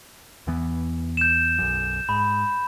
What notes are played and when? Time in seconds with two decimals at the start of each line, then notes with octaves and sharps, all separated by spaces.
0.47 E2 E3 B3
1.17 G6 E7
1.58 B1 F#2
2.09 G#2 B5